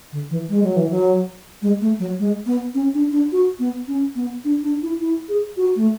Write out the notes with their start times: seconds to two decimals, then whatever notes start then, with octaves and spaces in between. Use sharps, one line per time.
0.12 D3
0.30 E3
0.49 G#3
0.63 F#3
0.76 E3
0.90 F#3
1.62 G#3
1.81 A3
1.99 F#3
2.19 G#3
2.46 B3
2.75 C#4
2.95 D4
3.12 D4
3.32 F#4
3.59 B3
3.88 C#4
4.16 B3
4.45 D4
4.64 D4
4.82 E4
5.01 E4
5.29 G#4
5.57 F#4
5.76 A3